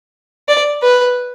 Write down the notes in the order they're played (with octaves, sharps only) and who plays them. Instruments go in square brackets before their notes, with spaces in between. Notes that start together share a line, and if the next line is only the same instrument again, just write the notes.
[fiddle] D5
B4